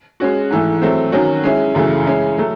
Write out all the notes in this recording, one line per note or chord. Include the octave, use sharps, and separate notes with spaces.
G#3 C#4 F#4
G#2 E3 A3
F#3 A3 C4
D#3 F#3 C#4 F#4
G#3 C#4 E4
F#2 C#3 E3 A3
G#3 C#4 E4
F#3 A3